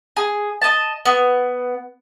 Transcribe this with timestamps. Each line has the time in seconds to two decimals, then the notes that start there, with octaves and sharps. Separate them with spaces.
0.17 G#4
0.62 D#5 A5
1.05 B3